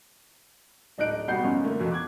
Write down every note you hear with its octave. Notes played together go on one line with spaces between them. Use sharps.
D1 D4 D#4 D#5 F#6 D7
B2 G3 B3 F#5 G6 C7
F#2 C#4 D#4 F4
D3 A3 A#3
F2 B2
D6 F#6 G#6